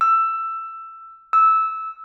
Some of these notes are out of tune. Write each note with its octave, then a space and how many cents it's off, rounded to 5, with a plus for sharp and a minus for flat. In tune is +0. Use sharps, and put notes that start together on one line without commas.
E6 +15
E6 -15